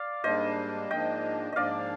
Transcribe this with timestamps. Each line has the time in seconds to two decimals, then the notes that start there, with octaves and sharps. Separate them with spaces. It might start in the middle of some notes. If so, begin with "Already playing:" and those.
Already playing: D5 F5
0.24 G#2 G3 A#3 D4 C5 D#5
0.90 G#2 F3 A#3 D4 D#5 G5
1.53 G#2 F3 A#3 D4 D5 D#5 F5